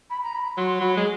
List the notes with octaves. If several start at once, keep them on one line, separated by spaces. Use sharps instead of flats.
B5
A#5
B5
F#3 C6
C6
F#3 B5
G#3